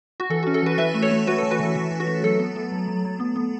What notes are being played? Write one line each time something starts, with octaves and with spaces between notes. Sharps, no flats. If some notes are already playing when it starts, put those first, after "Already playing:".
F#4
E3 A4
F#4
C#4
A4
E3 F#4 B4
E3 B4 E5
A3
A4 C#5
A3
A3 F#4 B4
A4
E3
F#4 B4
E3 A4
E3 F#4
E3
F#4
A3
F#3 A4
B3
B3
F#3
F#3
F#3
B3
B3